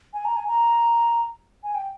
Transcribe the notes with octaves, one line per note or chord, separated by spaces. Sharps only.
G#5
A#5
G#5
A#5
G#5
G5